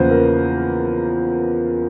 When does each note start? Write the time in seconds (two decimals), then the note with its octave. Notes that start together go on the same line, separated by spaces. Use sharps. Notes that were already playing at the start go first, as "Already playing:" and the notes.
Already playing: E2 C#3 F3 A#3 B4 C5
0.11 A#4